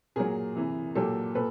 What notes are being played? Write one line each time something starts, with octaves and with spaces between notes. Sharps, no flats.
A#2 F#3 G#4 A#4
C3 E3
A#2 F#3 G4 A4
A#2 A4 B4